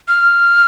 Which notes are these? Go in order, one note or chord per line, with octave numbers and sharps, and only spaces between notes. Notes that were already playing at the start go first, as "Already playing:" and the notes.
F6